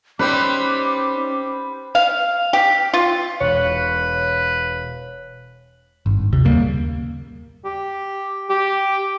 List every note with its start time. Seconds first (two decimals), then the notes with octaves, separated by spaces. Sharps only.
0.19 G3 C4 C#4 D#4 B4 C5 G5 D6
1.95 F5
2.53 G4
2.94 F4
3.40 E1 B4 C#5
6.06 G#1 G2
6.33 D#2 C3
6.45 D#2 C#3 G3 A#3
7.65 G4
8.50 G4